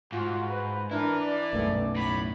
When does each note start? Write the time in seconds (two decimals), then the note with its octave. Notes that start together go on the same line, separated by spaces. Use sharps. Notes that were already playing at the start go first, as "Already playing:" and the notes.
0.12 G#2 F4 F#4
0.50 B4
0.91 D4 E4 A#4 B4
1.21 D5
1.53 B1 F#2 A3
1.96 A2 B5